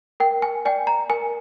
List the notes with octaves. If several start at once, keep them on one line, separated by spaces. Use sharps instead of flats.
A#4 G5
G#5
D5 G5 G#5
A#5
A#4 G#5